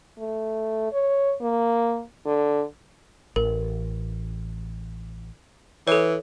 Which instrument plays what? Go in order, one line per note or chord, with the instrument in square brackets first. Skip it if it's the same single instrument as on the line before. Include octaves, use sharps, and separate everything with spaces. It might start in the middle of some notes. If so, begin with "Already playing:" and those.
[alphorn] A3
C#5
A#3
D3
[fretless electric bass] A1 [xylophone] A#4
[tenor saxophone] E3 [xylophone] A4 C#5